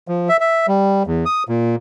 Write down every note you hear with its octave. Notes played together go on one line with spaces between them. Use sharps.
F3
E5
E5
G3
E2
D#6
A#2